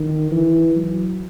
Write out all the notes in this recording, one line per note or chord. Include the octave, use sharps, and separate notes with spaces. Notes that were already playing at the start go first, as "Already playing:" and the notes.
Already playing: D#3
E3
F#3